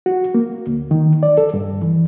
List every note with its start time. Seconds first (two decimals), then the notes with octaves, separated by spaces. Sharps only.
0.06 F#4
0.34 A#3
0.67 D2
0.91 D#3
1.23 D5
1.38 A4
1.54 G2
1.82 E3